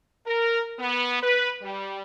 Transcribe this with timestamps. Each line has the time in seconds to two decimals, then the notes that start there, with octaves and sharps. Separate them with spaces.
0.25 A#4
0.78 B3
1.21 B4
1.61 G3